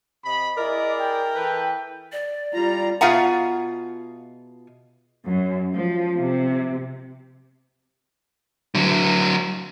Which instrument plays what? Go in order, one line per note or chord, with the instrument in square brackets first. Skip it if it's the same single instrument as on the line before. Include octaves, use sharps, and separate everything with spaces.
[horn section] C3 D#5 B5
[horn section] E4 G#4 D5 [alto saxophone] A#4 [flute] D#5
[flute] G5
[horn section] E3 A4 B4
[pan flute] D5
[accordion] G3 A#5 [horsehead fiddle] F4
[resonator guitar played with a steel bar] B2 F4 G#4 E5 F#5 A#5
[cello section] F#2
F3
C3
[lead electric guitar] D3 F#3